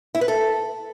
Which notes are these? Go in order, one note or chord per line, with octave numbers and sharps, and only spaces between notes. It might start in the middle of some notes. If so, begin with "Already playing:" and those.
E4
B4
A4